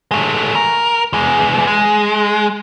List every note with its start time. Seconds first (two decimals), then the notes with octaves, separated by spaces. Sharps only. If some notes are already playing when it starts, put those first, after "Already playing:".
0.11 G#3 A3
0.55 A#4
1.13 E2 G#3
1.67 G#3